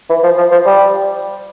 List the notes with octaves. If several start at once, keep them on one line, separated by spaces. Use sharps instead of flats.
E3
F3
F3
F3
G3